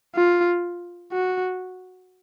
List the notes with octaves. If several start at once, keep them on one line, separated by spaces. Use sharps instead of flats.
F4
F#4